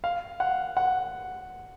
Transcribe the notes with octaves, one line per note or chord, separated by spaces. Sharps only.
F5
F#5
F#5